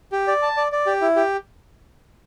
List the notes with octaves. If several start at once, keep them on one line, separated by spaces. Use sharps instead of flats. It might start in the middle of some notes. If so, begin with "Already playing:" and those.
G4
D5
A5
D5
D5
G4
E4
G4